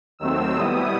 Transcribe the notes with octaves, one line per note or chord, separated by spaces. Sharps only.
D#2 D#3 F#3 A3 C4 E6
B2 G3 B3 E4 D#6